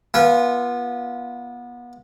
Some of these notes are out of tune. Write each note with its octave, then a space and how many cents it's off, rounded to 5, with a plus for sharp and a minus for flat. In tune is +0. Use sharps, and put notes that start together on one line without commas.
B3 -30 F4 -15 G#5 -35